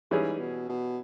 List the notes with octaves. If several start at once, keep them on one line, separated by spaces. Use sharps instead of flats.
G#2 E3 G3 C#4 G#4
B2
B2